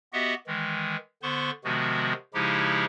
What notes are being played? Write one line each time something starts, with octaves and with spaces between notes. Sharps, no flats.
B3 F#4 G4 D#5 E5 F#5
D#3 E3 G#3
D3 B3 C5 C6 C#6
C3 D#3 F3 G#3 B3 F#4
C#3 F3 G#3 D#4 E4 G4